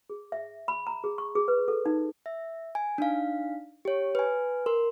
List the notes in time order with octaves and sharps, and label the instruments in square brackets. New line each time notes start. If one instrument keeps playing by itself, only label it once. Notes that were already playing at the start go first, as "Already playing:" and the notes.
[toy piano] G#4
E5
B5
A#5
G#4
C#6
G#4
B4
A4
D#4
[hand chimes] E5
G#5
D4 D#4 F5
G4 C#5
B4 G#5
A#4 C6